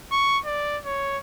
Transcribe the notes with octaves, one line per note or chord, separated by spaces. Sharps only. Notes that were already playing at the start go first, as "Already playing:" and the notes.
C#6
D5
C#5